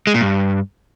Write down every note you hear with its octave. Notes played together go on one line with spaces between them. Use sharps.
G#3
A#2
G2